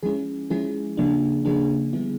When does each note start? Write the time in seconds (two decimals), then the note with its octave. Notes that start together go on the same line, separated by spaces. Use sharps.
0.03 F3 G#3 C#4 E4 G#4
0.50 F3 G#3 C#4 E4 G#4
0.97 C#3 F3 A#3 D4
1.45 C#3 F3 A#3 D4 G#4
1.93 D3 G3 B3 E4